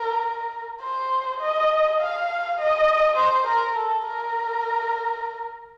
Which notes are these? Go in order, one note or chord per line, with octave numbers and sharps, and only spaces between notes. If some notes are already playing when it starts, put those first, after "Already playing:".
Already playing: A#4
C5
D#5
F5
D#5
C5
A#4
A4
A#4